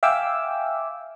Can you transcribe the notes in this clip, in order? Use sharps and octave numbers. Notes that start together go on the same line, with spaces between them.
E5 F5 G5 G#5 D6 E6